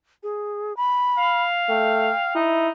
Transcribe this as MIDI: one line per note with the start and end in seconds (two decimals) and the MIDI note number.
0.23 0.76 68
0.77 1.42 83
1.18 2.35 77
1.69 2.11 57
1.69 2.36 79
2.35 2.70 63
2.35 2.69 64